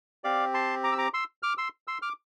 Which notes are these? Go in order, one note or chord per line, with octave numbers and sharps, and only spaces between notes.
C4 G4 D5 F5
A5 C6
A#5 D6
E6
A#5 D6
C6 E6
D6 F6
C6 E6
C6 E6
D6 F6